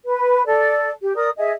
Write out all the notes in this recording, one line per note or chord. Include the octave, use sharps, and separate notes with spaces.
B4
A4 D5
G4
A#4 D5 D#6
G#4 D#5 E5